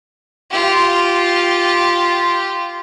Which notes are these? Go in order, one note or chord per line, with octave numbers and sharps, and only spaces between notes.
F4 G4